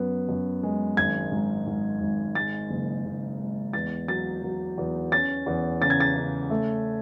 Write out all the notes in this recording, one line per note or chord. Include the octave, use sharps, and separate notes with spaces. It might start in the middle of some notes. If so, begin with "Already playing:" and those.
Already playing: F#2 B3
F#2
G#3
G#1 G#6
G#2
G#2
G#1
G#3 A6
F#1
F#1
G#3
E2 A6
F#3 A6
F#3
E2
C#4 A6
E2
C#3 A6
G#6
A6
C#3
A3